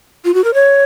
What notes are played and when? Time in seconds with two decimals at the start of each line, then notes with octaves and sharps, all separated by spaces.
0.25 F4
0.34 F#4
0.44 A#4
0.54 C#5